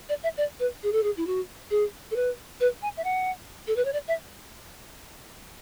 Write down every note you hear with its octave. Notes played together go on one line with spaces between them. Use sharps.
D5
E5
D5
B4
G#4
A4
G#4
E4
F#4
G#4
A4
B4
B4
G#5
E5
F#5
A4
B4
C#5
D5
E5